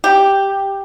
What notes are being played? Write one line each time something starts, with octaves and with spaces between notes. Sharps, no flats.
G4